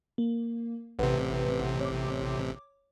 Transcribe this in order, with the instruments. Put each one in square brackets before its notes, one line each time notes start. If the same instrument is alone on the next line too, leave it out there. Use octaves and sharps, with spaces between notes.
[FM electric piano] A#3
[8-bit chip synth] A1 C3 [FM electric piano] B4 F#5
[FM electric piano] C#5 D6